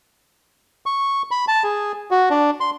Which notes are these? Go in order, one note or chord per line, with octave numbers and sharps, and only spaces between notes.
C#6
B5
A5
G#4
F#4
D4
C6